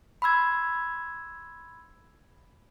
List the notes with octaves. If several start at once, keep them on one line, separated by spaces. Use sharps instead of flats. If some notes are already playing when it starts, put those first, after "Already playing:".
B5 C6 E6 G#6